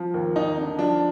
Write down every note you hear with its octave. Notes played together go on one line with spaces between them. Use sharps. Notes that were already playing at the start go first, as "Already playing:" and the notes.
Already playing: F3
D#2
D#2 D#4
D3
F3 D4